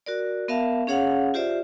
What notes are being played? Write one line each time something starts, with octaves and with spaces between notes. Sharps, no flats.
F#4 A#4 D5
B3 A#4 E5 F5 A5
C#4 G#4 C#5 F5 F#5
F4 G4 C5 D5 E5